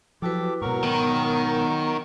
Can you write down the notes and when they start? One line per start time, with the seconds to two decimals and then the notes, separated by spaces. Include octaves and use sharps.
0.22 F3 F#3 E4 F#4 G4 A4 B4 D6
0.61 G#2 B2 F#3 A#4 C#6
0.83 D#3 B3